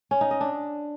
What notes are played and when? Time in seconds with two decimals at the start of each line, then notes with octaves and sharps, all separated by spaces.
0.11 C#4
0.21 D#4
0.31 D#5
0.41 D4